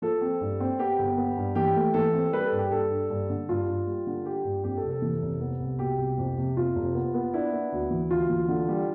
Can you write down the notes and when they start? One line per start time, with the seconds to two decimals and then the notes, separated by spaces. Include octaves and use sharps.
0.02 F3 A4
0.21 C4
0.41 G2
0.60 C4
0.79 B3 G4
0.99 G1
1.17 B3
1.37 G2
1.55 E3 G4
1.76 A3
1.94 E3 A4
2.14 C4
2.33 G3 B4
2.45 A4
2.52 G2
2.58 G4
2.71 G2 A4
2.91 D4
3.10 G2
3.30 D3
3.49 G2 F4
3.68 G2
3.87 G3
4.07 D3
4.25 G3 G4
4.44 G2
4.64 F2 G4
4.77 A4
4.83 F1
4.90 A4
5.02 E3
5.22 F1
5.40 B3
5.60 C2
5.79 B2 G4
5.98 C2
6.18 F2
6.38 C3
6.57 F2 F4
6.75 F1
6.94 B3
7.14 B3
7.34 D4 E4
7.53 B3
7.72 D2
7.91 E3
8.10 D2 F4
8.29 E3
8.48 D3
8.68 G3